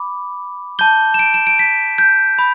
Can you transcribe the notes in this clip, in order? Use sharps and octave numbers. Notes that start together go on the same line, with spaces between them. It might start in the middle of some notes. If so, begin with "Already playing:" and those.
Already playing: B5 D6
A5 G6 G7
E7
D7
E7
D7
B6
G6
B5